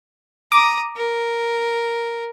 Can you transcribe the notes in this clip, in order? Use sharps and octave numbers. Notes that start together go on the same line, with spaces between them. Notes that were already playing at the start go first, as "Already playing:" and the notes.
A#5 D6 D#6
A#4